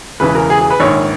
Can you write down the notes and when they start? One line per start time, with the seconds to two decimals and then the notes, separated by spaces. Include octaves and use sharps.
0.20 E1 E2 C#3 E3 B4
0.35 A#4
0.50 G#4
0.61 G#4
0.70 B4
0.80 A#1 G#2 D#3 C#5